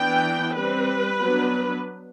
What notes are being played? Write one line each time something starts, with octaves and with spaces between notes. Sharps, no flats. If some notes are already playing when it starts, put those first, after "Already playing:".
Already playing: E3 B3 D4 G5
G3 C4 B4
F#3 B3 D4